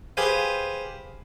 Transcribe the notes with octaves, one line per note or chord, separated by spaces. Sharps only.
G4 G#4 B4 C5 F5